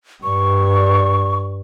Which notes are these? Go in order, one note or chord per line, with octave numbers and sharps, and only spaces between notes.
G2 C#6